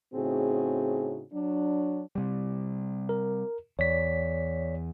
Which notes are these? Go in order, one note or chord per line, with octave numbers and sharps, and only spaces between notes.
A2 C#3 C4 D#4 F#4 G#4
F#3 D4
C3 G3
A#4
E2 C#5 D5 B6